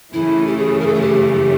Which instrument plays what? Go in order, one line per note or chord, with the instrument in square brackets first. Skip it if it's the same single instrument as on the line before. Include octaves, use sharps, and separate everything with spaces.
[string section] F#2 C#3 E3 A3 [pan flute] E4
[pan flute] G4
G#4
A#4
A4
G#4
G4